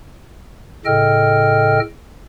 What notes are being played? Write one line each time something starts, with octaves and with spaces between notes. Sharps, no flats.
A2 C#3 A4 D#5 G5 F6